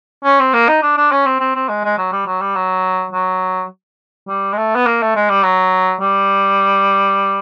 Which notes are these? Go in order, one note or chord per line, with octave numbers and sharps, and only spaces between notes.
C#4
C4
A#3
D#4
D4
D4
C#4
C4
C4
C4
G#3
G#3
F#3
G3
F#3
G3
F#3
F#3
G3
G#3
A3
B3
A#3
A3
G#3
G3
F#3
G3